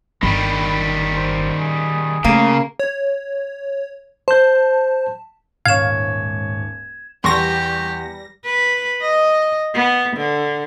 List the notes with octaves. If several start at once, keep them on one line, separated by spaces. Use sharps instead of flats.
G1 D#3 G3 B5
C5
G#4
C#3 A3 A#3
C#5
C5 A5 G6
D#1 G#2 C#5 F5 G#6 E7
E2 G3 G4 C6 C#6 A#6
B4
D#5
B3
D3